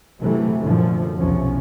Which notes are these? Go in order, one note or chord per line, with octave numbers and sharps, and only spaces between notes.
C3 E3 F#3 A3
F#2 A#2 D3 F3
B1 E2 C3 F3 C#4